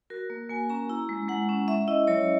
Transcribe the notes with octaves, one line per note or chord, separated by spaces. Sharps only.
F#4 A#4
A#3
A#3 G#5
C#4 A#5
E4 A#5
G#3
G#3 F#5
C#4
C#4 E5
E4 D#5
F#3 C#5